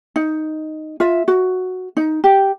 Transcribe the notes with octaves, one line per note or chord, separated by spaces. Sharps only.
D#4
F4 E5
F#4
D#4
G4